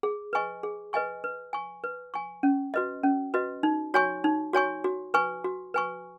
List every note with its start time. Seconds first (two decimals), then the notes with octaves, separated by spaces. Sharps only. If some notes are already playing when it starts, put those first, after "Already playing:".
0.03 G#4
0.33 B4 D#5 G#5 C#6
0.63 G#4
0.93 B4 D#5 G#5 C#6
1.24 B4
1.53 G#5 C#6
1.84 B4
2.14 G#5 C#6
2.43 C#4
2.74 F#4 B4 D#5
3.04 C#4
3.34 F#4 B4 D#5
3.63 D#4
3.94 F#4 C#5 G#5 C#6
4.24 D#4
4.53 F#4 C#5 G#5 C#6
4.84 F#4
5.14 B4 G#5 C#6
5.44 F#4
5.74 B4 G#5 C#6